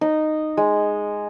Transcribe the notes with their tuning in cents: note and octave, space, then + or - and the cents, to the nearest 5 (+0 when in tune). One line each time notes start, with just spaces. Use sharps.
D#4 -10
G#3 +0